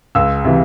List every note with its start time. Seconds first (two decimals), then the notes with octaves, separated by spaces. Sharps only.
0.15 C#2 E6
0.45 C3 E3